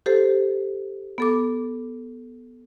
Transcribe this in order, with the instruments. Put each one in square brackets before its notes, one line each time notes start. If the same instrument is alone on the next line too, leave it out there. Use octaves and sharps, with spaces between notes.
[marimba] G4 A4 C5
B3 A4 D6